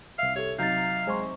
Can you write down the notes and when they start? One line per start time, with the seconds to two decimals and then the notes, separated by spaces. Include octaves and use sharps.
0.19 C2 E5 F5
0.36 G4 A4 C#5
0.59 C3 F#3 D#4 F5 G6 A6
1.07 G#3 C5 G#5 C6 C#6